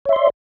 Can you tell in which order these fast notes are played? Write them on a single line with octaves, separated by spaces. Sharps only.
C#5 E5 C6 D5